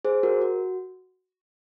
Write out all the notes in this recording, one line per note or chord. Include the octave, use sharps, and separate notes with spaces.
G#4 C5
F#4 A#4
F#4